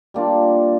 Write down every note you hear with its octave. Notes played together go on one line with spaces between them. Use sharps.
G3 A#3 D4 F4